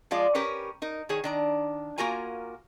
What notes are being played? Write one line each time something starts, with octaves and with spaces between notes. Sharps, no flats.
F3 G#3 F4 D5
C#4 G4 A#4 B4 C#5
D#4 A#4
D#3 G#4 C#5
D#3 D4 A#5
A#3 F4 F#4 A#4 G#5 A#5